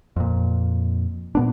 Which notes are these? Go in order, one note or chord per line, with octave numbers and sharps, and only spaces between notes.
F2 A#2
A#2 B3 D4